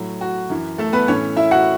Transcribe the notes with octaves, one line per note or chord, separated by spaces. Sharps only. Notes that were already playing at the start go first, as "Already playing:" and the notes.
Already playing: A2 F#3
F#4
F#2 E3
A3 A4
B3 B4
A2 E3 C#4 C#5
E4 E5
F#4 F#5